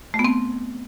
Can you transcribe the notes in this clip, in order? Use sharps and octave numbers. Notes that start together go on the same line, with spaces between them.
A3
B3
C4